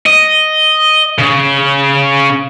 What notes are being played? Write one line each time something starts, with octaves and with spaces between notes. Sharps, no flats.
D#5
C#3